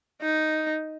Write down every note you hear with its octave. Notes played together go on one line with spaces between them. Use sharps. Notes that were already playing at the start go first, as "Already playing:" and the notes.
D#4